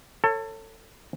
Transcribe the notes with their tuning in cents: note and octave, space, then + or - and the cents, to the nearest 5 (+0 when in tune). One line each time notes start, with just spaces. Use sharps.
A4 +30 C#5 -10